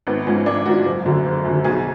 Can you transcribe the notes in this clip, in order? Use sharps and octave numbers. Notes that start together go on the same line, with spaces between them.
G#1 B3
G#2 F3 C#4
G#1 D4
G#2 F3 F#4
F#1
F#2 D3
F#1
F#2 D3
B1 G#4